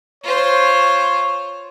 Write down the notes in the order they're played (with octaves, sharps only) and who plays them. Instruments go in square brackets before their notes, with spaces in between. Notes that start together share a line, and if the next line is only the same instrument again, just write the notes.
[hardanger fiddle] F4 C5 [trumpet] C#5